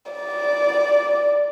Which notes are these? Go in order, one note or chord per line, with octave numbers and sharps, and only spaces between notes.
D5